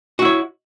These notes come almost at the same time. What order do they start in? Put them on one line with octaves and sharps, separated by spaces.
F#4 E4 C#5